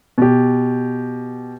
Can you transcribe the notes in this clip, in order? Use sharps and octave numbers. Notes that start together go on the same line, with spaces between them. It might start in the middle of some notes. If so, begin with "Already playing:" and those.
B2 G4